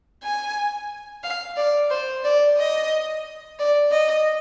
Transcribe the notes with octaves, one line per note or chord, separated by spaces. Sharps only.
G#5
F5
D5
C5
D5
D#5
D5
D#5